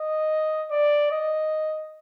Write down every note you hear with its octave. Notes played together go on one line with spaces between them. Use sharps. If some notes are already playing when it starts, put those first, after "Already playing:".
Already playing: D#5
D5
D#5